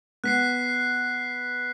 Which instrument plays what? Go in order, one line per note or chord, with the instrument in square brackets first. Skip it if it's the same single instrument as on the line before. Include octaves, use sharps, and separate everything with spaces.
[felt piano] B3 [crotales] F#6 B6 C7